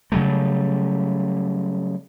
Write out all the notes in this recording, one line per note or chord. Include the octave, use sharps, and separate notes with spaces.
C#3 F#3 G3 A3